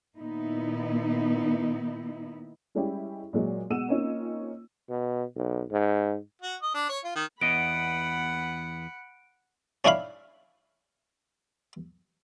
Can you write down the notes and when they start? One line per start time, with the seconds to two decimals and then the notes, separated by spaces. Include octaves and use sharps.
0.17 A#2 D#3 B3 D#4 E4
2.75 G3 G#3 C#4 E4 G4
3.33 A#2 F#3 G#3
3.70 B2 G#3 F#5 E6 D#7 E7
3.88 A#3 C4 C#4 D#4 F4
4.90 B2
5.36 B1
5.72 G#2
6.42 F#4
6.62 D#5
6.74 D4
6.89 C#5
7.04 F4
7.16 D#3
7.41 E2 B3 D#5 F#5 B5 D7
9.85 C#4 D4 E4 C#5 F5 B5